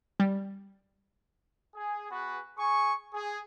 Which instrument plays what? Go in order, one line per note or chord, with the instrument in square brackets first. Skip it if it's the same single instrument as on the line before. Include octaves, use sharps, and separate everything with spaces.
[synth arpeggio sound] G3
[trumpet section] G#4
B3 F#4 G#4 B4
G#4 G#5 C#6
G#4